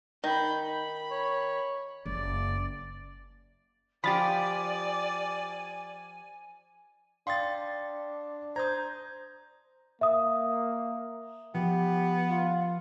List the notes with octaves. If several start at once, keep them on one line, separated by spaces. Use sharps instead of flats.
D#3 B5 G6
B5
C#5
F#1 D5
F3 G4 D5 G#5 B5 A6
D4 F5 G5 C6 D#6 A6
C5 A#5 D#6 G6 G#6
A#3 E5 D#6
F3 B3 G4
F4